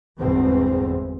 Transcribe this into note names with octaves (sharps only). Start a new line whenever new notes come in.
G1 E2 G#2 B2 C4